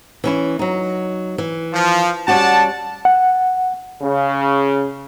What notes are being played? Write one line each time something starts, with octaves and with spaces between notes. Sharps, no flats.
E3 C#4 E4
F#3 D#4
E3
F3
G3 C#4 F#4 D5 F#5 A5
F#5
C#3